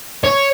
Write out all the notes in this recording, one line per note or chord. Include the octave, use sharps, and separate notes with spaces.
C#5